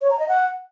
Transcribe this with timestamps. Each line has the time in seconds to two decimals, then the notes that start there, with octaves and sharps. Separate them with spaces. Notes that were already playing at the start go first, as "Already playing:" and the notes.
0.02 C#5
0.10 A#5
0.19 D#5
0.28 F#5